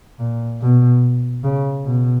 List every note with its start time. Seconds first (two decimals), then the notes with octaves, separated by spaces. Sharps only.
0.19 A#2
0.62 B2
1.44 C#3
1.86 B2